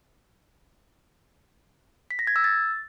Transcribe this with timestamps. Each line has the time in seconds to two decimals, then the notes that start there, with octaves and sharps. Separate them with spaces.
2.11 B6
2.19 A#6
2.27 G#6
2.36 E6
2.44 A6